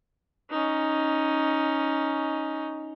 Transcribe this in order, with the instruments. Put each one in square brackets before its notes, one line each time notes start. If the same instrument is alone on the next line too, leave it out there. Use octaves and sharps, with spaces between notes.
[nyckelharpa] C#4 D#4